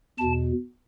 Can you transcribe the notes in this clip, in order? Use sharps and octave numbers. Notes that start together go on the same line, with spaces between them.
E2 B2 A5